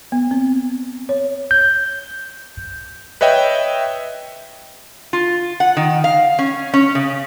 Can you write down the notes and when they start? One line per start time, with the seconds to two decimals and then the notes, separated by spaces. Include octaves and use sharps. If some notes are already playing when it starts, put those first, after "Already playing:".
0.12 B3
0.31 C4
1.09 C#5
1.51 G6
3.21 B4 C#5 D#5 E5 G5
5.13 F4
5.60 F#5
5.77 D#3
6.04 F5
6.39 C#4
6.73 C#4
6.95 C#3